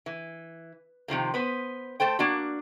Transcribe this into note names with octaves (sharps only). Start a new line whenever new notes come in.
E3
C3 D#3 F3 A#3
B3 B4 C5
A3 A4 C5 G5
A#3 D4 F#4